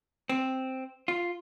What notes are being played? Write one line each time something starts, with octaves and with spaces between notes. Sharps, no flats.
C4
F4